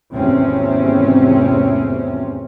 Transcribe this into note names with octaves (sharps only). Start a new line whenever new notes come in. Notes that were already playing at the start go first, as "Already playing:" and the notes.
G#1 E2 C3 A3 C4 C#4